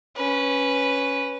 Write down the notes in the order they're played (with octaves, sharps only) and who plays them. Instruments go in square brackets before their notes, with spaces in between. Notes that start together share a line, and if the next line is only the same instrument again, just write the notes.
[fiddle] C#4 B4